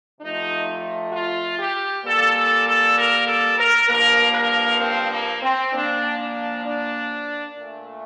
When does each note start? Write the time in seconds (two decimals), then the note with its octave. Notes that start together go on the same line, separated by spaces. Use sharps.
0.21 F2 C3 F3 A3 D#4
1.13 F4
1.59 G4
2.05 A#2 G3 A#3 A4
2.35 A4
2.67 A4
2.98 A#4
3.28 A4
3.59 A#4
3.89 G2 F3 A#3 A#4
4.35 A#4
4.81 C4
5.12 A#3
5.43 C4
5.73 A#2 F3 A#3 D4
6.19 D4
6.65 D4
7.57 A#2 A3